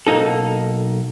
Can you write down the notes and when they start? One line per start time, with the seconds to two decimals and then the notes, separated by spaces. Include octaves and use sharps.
0.07 B1 A#3 D#4 A4